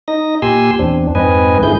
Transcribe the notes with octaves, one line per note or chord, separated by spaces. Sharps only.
D#4 D#5 A#6
A#2 G4 G#5 C6 E6
E2 C4 D4
F2 G#2 C4 B4 D#5 G#5
G#2 D3 E4 G#4 G6